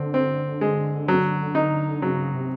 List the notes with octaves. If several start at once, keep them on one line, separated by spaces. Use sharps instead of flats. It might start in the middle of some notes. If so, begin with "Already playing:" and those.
Already playing: D3 C4
C4
G#3
F#3
D#4
C#3 F#3
C3